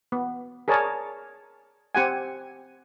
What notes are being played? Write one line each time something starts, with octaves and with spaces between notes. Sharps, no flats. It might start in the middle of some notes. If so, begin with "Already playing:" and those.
B3
G#4 A#4 C#5 D5 A5
C4 G4 F#5 G#5